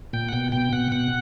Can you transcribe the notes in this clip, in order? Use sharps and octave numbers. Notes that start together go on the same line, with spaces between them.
A#2 G5
F#5
B2 G5
B2 G5
B2 F#5
B2 F#5